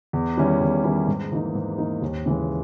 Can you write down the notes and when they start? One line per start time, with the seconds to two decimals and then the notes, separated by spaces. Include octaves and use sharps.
0.13 E2
0.37 D#3 G3 C#4 E4
0.60 E2
0.84 D#3 G3 C#4 E4
1.08 G#2
1.32 E3 A#3 D#4
1.55 G#2
1.78 E3 A#3 D#4
2.02 D#2
2.26 C#3 E3 G#3